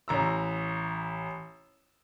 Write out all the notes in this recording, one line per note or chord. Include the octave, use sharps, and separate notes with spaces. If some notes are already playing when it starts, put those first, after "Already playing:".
A1 A#5 E6